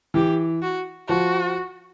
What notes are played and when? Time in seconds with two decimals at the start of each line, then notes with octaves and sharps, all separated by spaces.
0.14 E3 G4
0.62 F#4
1.08 F3 F#4